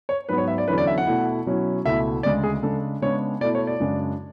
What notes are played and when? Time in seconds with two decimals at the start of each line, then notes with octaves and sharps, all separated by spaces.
0.09 C#5
0.29 G#2 F#3 B3 B4
0.38 C#5
0.48 E5
0.58 D5
0.68 E2 D3 F#3 C#4 E4 B4
0.78 D5
0.87 E5
0.98 F#5
1.07 B2 A3 E4
1.46 B2 F#3 C#4 E4
1.85 C#2 B2 A3 E4 E5
2.23 D2 C#3 G#3 D5
2.44 G#4
2.62 C#3 G#3 D4 A4
3.02 C#3 G#3 B3 D4 C#5
3.41 B2 A3 E4 D5
3.55 C#5
3.67 D5
3.80 F#2 C#3 G#3 D4